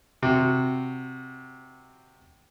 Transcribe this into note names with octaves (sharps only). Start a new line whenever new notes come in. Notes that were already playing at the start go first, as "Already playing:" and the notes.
C3 F#4